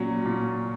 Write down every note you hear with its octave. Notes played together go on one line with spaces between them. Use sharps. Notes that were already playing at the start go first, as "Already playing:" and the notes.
Already playing: A#2 F#3 C#4
A#2